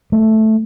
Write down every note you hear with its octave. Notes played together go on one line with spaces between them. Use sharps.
A3